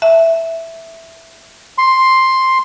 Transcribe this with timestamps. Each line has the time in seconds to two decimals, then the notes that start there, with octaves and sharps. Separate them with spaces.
0.02 E5
1.78 C6